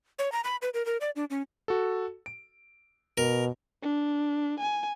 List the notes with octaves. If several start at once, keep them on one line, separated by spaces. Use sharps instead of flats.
C#5
A#5
B5
B4
A#4
A#4
D5
D4
C#4
F#4 A4
D7
B2 A#4
D4
G#5